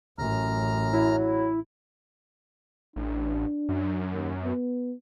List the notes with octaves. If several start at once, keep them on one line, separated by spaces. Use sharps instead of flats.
A1 F#2 A#5 F6
F#3 E4
A1 D4
F#2
D#2
B3